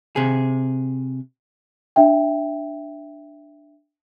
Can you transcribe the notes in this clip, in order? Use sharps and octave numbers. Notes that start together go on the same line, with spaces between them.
C3 G#4
D4 E5 G5